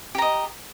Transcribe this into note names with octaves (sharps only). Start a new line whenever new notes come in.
G4 D#5 A#5